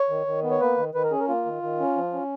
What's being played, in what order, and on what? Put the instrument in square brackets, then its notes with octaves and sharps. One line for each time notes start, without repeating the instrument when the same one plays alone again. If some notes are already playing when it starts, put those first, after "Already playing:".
Already playing: [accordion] C#5
D#3
D#3
B3
C#5
A#3 B4
D#3
D#3 B4
A#4
C#4 G#4
A#4
A#3 F4
D#3
D#3
C#4
F3
C#4